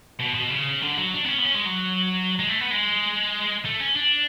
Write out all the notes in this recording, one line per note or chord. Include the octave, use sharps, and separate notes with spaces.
B2
B2
C#3
D3
F#3
D4
B3
C#4
B3
C#4
G#3
F#3
G#3
A3
B3
G#3
A3
C#4
D4